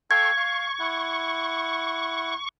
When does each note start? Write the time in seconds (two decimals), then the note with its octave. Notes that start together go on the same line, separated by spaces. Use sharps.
0.11 A4 F5 G5 C#6 G#6
0.37 F5
0.79 E4 F#5